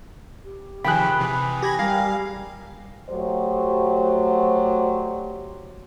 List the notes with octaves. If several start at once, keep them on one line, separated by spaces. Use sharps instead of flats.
G4
C3 D#3 F3 G#4 G5 B5 F#6
C3 E3
G4 B5 G#6 A#6
G3 A#4 F5
F#3 A3 F#4 G4 C5 D5